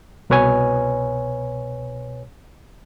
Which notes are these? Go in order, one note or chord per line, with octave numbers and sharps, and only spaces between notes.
C2 B2 B4 C#5 G#5